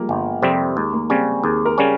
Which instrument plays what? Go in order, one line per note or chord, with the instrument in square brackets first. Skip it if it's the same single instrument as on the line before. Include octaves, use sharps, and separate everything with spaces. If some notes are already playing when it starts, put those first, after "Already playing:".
Already playing: [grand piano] F3 G3 G#3 A#3
[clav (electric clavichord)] G1
F2 C3 G3 C4
[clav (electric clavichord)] D#2 [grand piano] G#3
[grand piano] A#3
[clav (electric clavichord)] C#3 G3 C#4 [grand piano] C4
[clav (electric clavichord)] D#2 [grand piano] G#4
[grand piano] A#4
[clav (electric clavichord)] C#3 G3 C#4